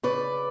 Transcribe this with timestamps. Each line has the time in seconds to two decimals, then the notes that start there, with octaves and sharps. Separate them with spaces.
0.03 C#3 B4 D5